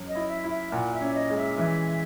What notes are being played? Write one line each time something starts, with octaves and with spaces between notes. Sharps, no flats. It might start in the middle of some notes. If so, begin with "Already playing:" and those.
Already playing: F#2 C#4
D#5
E4
E5
E4
E5
A#2 F#5
E5
C#4
D#5
G#3
E5
E3 E5